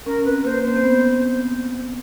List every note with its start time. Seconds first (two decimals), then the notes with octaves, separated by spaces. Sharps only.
0.06 C#4 A#4
0.25 C4 B4
0.45 A#3 C5
0.64 A#3 C5
0.76 C4
0.83 B3